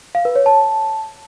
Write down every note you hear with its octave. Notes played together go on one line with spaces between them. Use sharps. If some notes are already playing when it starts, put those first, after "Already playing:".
F5
B4
C#5
A5